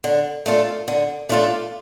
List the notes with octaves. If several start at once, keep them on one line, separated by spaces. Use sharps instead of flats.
D3
A3 D4 F4 A4
D3
A3 D4 F4 A4